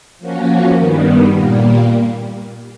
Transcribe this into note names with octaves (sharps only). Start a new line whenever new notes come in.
F3 A#3 C#4 F#4
G2 D#3 G3 B3
A#2 G3 A#3